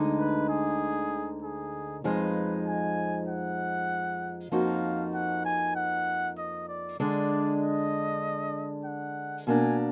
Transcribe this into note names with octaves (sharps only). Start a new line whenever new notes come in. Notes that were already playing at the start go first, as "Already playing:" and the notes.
Already playing: D2 D3 G#3 D#4
B4
G#4
G#4
F2 F3 G#3 D#4 B4
G#5
F#5
F2 F3 A#3 D#4 F#4 F5
F#5
G#5
F#5
D#5
D5
D3 G#3 D4 D5
D#5
F#5
B2 A#3 D4 G#5